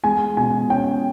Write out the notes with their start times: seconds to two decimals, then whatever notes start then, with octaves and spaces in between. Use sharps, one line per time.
0.04 G#3 G#5
0.37 B2 G#5
0.70 C#4 G5